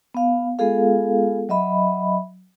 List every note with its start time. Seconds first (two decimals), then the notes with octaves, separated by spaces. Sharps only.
0.14 B3 F5
0.59 G#3 B3 F4 G#4 A4 F5
1.49 F#3 D#5 E5 B5